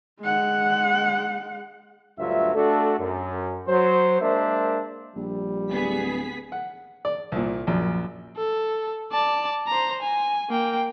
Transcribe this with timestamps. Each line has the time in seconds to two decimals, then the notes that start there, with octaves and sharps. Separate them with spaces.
0.21 G#3 F#5
2.19 D2 G2 F#3 F4 E5
2.55 A3 D4 F#4 A4
3.00 F#2
3.68 F#3 C5
4.21 G#3 A#3 D4 A#4 C5 E5
5.16 A#1 G3
5.71 D1 B3 G#4 B6
6.52 F#5
7.05 D5
7.32 C2 A#2
7.67 A#1 F#2
8.37 A4
9.12 D5 A5
9.68 C5 A#5
10.02 G#5
10.50 A#3 G5